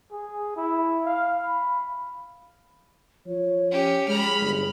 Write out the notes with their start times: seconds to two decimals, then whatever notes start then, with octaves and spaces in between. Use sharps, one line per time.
0.11 G#4
0.56 E4
1.05 F5
1.45 B5
3.26 F3 C#5
3.71 C#4 G4
4.08 G#3 G#4 B5 F6
4.40 G1